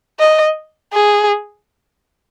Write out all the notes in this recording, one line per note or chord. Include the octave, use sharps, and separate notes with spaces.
D#5
G#4